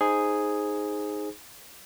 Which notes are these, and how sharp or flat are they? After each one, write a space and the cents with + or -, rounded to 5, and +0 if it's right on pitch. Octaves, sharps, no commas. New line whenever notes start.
D#4 +0 G#4 +0 C5 +0